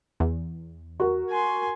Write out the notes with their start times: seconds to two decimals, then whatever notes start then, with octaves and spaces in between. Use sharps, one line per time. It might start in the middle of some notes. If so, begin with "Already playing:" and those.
0.20 E2
1.00 F#4 A#4
1.30 G#5 C6